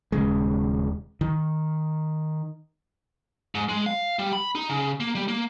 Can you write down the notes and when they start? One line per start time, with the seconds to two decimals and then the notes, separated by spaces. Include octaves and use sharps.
0.12 D#1 C#3 G#3
1.21 D#3
3.55 G#2
3.69 G#3
3.86 F5
4.19 G3
4.33 B5
4.55 D#4
4.69 C#3
5.00 A#3
5.15 G3
5.28 A#3